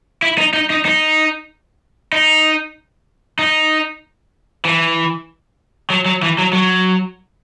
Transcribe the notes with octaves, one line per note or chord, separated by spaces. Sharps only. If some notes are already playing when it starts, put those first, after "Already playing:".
E4
D#4
D#4
D#4
D#4
D#4
D#4
E3
F#3
F#3
E3
F#3
F#3